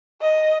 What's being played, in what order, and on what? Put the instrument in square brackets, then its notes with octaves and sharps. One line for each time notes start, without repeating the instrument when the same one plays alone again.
[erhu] D#5